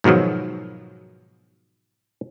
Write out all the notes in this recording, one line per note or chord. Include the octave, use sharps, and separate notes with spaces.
G#2 B2 D#3 F3 F#3